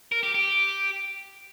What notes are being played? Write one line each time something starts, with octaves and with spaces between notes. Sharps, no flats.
A#4
G4
G4